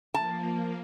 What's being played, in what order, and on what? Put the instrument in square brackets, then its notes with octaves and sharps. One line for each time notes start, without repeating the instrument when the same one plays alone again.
[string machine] F3 A#3 [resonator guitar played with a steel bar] A5